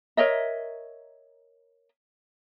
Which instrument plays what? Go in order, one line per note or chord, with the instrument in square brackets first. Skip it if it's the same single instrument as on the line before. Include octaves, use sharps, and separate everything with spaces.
[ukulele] A#4 C#5 D#5 E5